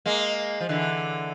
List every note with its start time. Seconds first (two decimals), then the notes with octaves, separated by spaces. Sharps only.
0.06 G#3 A#3
0.61 F3
0.69 D3 E3